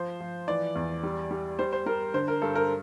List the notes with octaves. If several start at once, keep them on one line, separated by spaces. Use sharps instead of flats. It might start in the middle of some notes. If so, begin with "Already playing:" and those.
Already playing: F3 C5
F3
E3 D5
E2
G3
G3
G3 C5
C5
G3 A#4
D3 C5
A#4
G2 A4
A#4